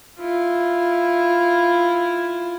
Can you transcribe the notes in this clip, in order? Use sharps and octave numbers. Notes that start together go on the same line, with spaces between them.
E4 F4